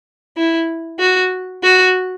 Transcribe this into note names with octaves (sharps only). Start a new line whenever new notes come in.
E4
F#4
F#4